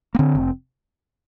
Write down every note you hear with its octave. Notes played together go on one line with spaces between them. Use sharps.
A#3
D3 C4
F1